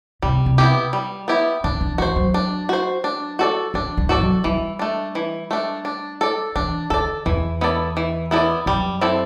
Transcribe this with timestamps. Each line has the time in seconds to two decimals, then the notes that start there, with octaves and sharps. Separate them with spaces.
0.22 C3 G3
0.46 C3
0.58 B3 E4 G4
0.93 G3
1.28 B3 E4 G4
1.64 D3 D4
1.81 E3
1.98 E3 F#4 C5
2.16 F#3
2.34 D4
2.69 F#4 C5
3.04 D4
3.39 F#4 A4 D5
3.74 E3 D4
3.97 G3
4.09 E3 F#4 A4 D5
4.21 F#3
4.44 E3 G3
4.79 A3 D4
5.15 E3
5.51 A3 D4
5.85 D4
6.21 A4 D5
6.56 E3 D4
6.90 D3 A4 D5
7.26 E2 E3
7.61 B3 E4 A4 D5
7.97 E3
8.31 B3 E4 A4 D5
8.66 F#2 G3
9.01 C4 E4 A4 D5